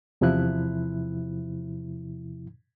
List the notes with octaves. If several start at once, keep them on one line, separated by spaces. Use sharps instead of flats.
E2 C3 F3 E4 F#6